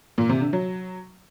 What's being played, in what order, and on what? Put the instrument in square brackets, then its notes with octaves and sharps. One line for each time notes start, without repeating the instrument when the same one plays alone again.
[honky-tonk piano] A#2
C3
D3
F#3